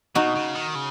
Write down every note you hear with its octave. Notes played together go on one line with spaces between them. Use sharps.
B2 D#4 F#4
C#3
D#3
C#3